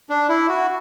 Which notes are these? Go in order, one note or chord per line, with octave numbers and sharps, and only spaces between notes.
D4
E4
F#4